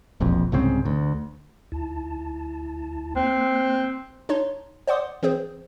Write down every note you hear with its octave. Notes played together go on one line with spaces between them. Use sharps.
E1 A#1 F2
C2 G#2 C#3 C4
D2
D2 E4 A5
A#3 C4 F#6
D4 D#4 C#5 C6
C5 D5 F#5 C6 D6 D#6
E3 C4 G#4 C5